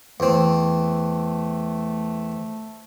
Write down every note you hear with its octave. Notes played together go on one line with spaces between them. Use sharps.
E2 A3 C4